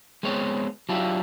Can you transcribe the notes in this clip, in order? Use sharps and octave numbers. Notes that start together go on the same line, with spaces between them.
G#3 B3 C4 C#5
F#3 D4 E4 F4 G4